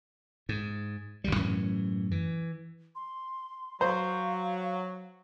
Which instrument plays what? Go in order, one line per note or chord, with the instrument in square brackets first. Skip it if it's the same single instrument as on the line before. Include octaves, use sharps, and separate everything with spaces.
[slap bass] G#2
G1 D2 G3
F#2 A2 E3 C#4
E3
[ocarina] C6
[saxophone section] F#3 [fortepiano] C5 [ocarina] F5